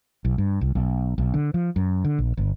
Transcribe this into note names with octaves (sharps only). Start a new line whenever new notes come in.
B1
G2
C2
B1
B1
D3
F3
F#2
D3
A#1
G1